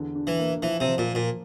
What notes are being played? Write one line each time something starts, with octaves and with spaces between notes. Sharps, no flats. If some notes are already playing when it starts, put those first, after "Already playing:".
Already playing: E2 D3
D4
E3
A#3
E3 F3
C3
F3
A#2
A#3
A#2